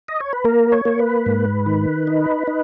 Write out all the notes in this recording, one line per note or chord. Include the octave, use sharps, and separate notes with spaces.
D#5
C#5
B4
A#3 A#4
C#5
A#3
B4
G#2
D#3
D#4
D#4